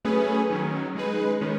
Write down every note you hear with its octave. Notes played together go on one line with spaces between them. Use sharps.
F#3 A3 C#4 G#4 B4
D#3 F#3 C#4
G#3 D#4 G#4 B4
D#3 G#3 C#4